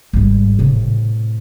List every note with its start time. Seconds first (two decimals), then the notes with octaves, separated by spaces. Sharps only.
0.13 G#1 G3
0.59 A2 C3